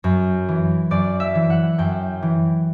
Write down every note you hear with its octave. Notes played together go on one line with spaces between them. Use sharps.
F#2
E3
F#2 D5
E5
E3
F#5
F#2 G5
E3